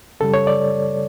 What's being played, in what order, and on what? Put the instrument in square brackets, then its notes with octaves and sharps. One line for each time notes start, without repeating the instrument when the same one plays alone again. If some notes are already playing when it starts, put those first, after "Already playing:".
[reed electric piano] F#2 C#3 G3 A4
C#5
D5